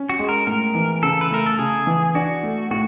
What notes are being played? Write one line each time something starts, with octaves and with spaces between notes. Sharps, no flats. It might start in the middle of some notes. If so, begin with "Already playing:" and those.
Already playing: C#4
F#4
G#3
A#4
A2 A#4
E3
C#3 A4
B4
A3 A#4
A4
C#3 G#4
E3
D4 F#4
A3
A2 F#4